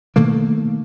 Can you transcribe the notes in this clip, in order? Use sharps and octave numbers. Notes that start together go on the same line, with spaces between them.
B2 D#3 A3 A#3